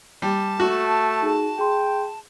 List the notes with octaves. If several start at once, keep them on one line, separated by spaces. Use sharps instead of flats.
G3 A5
A3 F#4
D#4 G#4
G#4 G5 C6